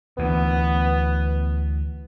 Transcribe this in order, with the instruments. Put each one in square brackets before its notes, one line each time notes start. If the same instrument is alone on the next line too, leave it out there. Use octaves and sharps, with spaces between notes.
[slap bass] D2 E3 [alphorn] B3